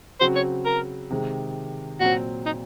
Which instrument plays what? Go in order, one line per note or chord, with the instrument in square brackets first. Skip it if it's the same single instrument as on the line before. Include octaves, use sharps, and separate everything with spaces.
[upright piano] C#3 F#3 C4 F#4 [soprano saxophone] C5
[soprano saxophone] C#5
A#4
[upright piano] C3 D#3 G#3
[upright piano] A#2 F#3 C4 [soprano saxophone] F#4
[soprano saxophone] D#4